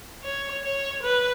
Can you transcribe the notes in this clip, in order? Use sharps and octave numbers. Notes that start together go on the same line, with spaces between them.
C#5
C#5
B4